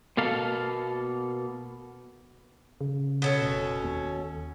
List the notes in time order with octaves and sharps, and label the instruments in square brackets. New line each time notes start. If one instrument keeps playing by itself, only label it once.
[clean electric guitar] B2 A#3 A4 F5
[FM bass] C#3
[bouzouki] B2 C#4 A4
[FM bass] F1
D#2